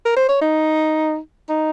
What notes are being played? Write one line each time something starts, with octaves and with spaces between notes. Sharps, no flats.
A#4
C5
C#5
D#4
D#4